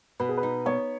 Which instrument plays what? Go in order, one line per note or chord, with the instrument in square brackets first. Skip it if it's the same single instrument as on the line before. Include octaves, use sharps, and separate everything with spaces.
[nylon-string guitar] B2 [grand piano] B4
[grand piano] G#4
B4
[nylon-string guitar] D#4
[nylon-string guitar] B3 [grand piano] C#5